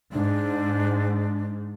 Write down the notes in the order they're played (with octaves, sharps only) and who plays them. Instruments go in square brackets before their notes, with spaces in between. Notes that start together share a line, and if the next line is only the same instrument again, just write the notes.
[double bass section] G#2 [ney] D4